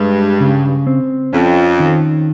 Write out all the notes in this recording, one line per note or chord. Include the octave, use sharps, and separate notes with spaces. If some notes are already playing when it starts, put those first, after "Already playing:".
Already playing: G2 G#3
C#3
C4
F2 C#4
D#3